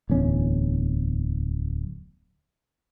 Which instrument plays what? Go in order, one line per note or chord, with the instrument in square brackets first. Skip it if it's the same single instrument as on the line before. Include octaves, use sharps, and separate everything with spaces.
[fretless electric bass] D1 E2 C#4